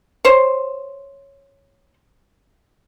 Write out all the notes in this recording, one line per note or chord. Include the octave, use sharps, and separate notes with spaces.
C5 C#5